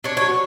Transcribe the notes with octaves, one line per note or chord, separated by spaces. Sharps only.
D4 C#5
C#5
F#3